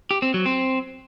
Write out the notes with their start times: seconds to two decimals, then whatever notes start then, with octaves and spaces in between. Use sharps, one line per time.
0.11 G4
0.22 C4
0.34 F#3
0.46 C4